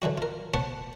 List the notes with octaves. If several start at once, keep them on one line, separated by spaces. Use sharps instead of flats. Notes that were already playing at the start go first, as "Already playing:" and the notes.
D3 E3 F#3 F#4
F4 A#4
C5 C#5 F#5 A5 B5 C#6